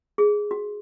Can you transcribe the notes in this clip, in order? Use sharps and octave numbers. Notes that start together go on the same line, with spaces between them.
G#4
F#4